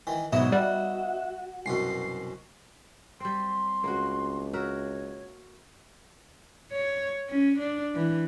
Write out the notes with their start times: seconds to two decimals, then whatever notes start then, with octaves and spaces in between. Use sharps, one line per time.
0.07 D#3 E3
0.33 G#2 B2 F#3 B3 D#4 D#5 E5
0.52 G3 F#4
1.66 C2 F#2 B2 C7
3.20 G3 C4 C6
3.84 C#2 A#3 F#4
4.53 F#4 A#4 C#5 E5
6.72 C#5
7.29 C#4
7.58 D4
7.95 E3